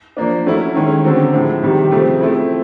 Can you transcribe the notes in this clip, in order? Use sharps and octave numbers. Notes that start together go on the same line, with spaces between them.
F3 A#3 D4
F#3 A3 C#4 E4
D#3 G#3 C#4
D3 F#3 A3 C4
A2 F3 G#3
C3 D#3 G3
C#3 F3 A3 C4
F3 A3 C4 E4